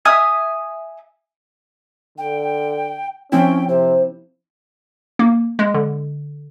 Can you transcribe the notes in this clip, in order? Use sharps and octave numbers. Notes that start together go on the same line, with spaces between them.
E5 G#5 D#6 F6
D3 G5
F3 C4 C#4 E4 G5
C3 C5
A#3
G#3
D3